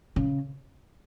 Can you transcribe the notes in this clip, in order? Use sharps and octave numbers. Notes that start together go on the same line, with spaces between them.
C#3